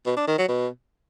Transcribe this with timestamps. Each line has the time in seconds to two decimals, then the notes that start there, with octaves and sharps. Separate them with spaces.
0.06 B2
0.17 D4
0.27 D#3
0.38 F#3
0.48 B2